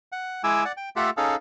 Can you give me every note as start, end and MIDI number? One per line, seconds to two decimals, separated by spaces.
0.12 0.42 78
0.44 0.64 56
0.44 0.64 64
0.44 0.64 80
0.44 0.64 86
0.44 0.64 88
0.65 0.72 74
0.65 0.72 78
0.77 0.89 79
0.96 1.10 57
0.96 1.10 65
0.96 1.10 67
0.96 1.10 69
0.96 1.10 76
0.96 1.10 78
1.17 1.36 61
1.17 1.36 63
1.17 1.36 68
1.17 1.36 69
1.17 1.36 77